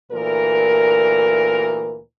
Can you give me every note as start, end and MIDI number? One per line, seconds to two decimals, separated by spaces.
0.12 1.99 38
0.12 1.99 46
0.12 1.99 52
0.12 1.99 70